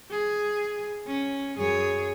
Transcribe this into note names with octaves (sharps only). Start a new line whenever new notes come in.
G#4
C#4
F#2 G#4 C#5